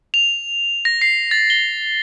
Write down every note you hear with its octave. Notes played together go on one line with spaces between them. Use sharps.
F7
A#6
C7
A6
G7